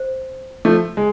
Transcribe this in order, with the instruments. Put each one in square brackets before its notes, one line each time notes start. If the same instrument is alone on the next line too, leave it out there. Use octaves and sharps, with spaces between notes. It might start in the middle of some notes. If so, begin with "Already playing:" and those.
Already playing: [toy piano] C5
[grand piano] F3 A3
G#3